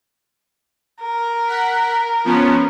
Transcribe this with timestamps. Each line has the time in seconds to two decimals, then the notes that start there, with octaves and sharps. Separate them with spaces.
1.02 A#4
1.47 F#5 B6
2.24 F3 B3 C#4